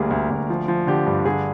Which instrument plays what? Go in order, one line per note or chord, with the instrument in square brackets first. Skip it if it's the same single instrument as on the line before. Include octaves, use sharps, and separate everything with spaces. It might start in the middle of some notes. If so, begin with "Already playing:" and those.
Already playing: [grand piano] D2 G3 A#3 G#4 A#4
D2
D2
F3
F3
D3 G4
G2
D3 G#4